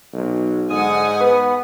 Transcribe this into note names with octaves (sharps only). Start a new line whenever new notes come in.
B1
G#2 D3 F#5 G#5 D#6
B3 B4